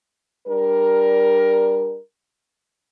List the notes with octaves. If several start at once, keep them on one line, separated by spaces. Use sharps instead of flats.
G3 D4 A#4